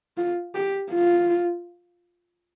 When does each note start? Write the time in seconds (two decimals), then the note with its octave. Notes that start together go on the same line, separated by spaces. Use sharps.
0.17 F4
0.55 G4
0.91 F4